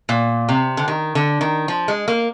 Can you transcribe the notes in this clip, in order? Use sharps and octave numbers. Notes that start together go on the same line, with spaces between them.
A#2
C3
D3
D#3
D3
D#3
F3
G#3
A#3